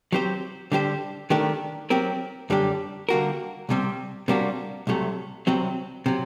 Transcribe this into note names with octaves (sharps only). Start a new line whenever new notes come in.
F#3 C4 G4 C5
D3 G3 D4 G4 C5
D#3 A3 D4 G4 A#4
F#3 C4 G4 A#4
F#2 D3 G3 D4 G4
D3 G3 A#3 F#4 A#4
C2 C3 G3 C4
C3 G3 A#3 D4 F#4
C2 C3 F#3 A3
C2 C3 F#3 C4
C3 F#3